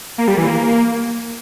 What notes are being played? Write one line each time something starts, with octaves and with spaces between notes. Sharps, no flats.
A#3
G3
E3
A#3